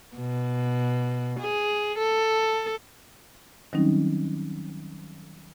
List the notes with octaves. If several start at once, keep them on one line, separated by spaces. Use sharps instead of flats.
B2
G#4
A4
D#3 F#3 G3 C4 C#4 D#4